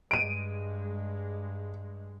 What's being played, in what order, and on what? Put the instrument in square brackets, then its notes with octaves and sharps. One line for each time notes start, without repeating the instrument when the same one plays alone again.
[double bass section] G2 G#3 [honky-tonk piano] D7 D#7